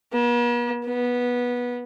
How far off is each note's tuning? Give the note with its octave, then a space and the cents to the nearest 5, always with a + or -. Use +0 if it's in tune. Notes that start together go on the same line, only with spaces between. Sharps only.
B3 -45
B3 -15